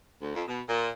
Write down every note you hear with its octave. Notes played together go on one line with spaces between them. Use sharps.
D2
F2
B2
A#2